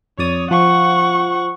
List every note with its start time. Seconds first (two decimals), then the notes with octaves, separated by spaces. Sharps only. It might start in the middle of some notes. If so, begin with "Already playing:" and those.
0.19 F2 C#5 D5 D#6
0.51 F3 F#5 C#6